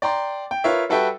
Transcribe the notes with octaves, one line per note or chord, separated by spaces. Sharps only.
D5 G5 A#5 C6
G5
F4 A#4 B4 C#5 E5
G3 F#4 A4 B4 E5 G5